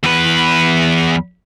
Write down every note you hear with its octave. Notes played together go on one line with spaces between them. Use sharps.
E2 B4